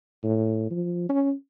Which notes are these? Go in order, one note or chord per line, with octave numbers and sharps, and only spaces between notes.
A2
F3
C#4